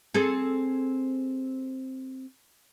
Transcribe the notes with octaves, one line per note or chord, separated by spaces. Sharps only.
C4 G#4 A4